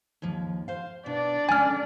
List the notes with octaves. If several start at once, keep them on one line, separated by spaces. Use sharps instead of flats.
D#2 G#2 F3
C5 F5
B2 D4 D5
C#3 G#3 A4 G#5 F6